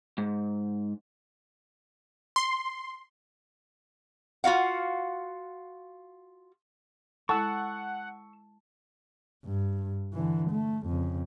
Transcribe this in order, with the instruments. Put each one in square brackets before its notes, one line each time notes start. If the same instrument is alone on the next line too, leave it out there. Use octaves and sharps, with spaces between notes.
[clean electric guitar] G#2
[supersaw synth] C6
[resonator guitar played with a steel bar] F4 F#4 F5 F#5
[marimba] G#3 E4 A4 [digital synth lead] F#5 [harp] A5 [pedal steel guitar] C#6 E6
[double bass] G2
D3 E3
A3
F2 C#3